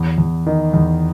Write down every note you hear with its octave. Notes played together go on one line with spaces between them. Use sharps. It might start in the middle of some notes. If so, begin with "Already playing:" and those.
Already playing: E2
E2
D#3
E2